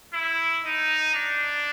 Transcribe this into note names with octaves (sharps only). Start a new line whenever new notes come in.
E4
D#4
D4